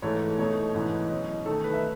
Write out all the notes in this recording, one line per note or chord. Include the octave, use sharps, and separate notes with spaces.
G#2 E3 A3 C#5
B2 A3 D#4 C#5
G#2 E3 B3 D#4
B2 F#3 C#4 D#5
D#3 A3 D#4 A4
B4
E5